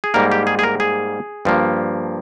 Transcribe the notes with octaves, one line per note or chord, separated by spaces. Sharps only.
G#4
G#2 G3 A#3 A#4
G4
G#4
G#4
A#4
G#4
G2 F3 A#3